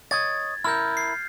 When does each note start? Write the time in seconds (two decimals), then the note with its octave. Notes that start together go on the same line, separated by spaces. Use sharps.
0.11 C#5 D#5 G#6 A6
0.64 E4 A#4 F6 G6
0.97 C7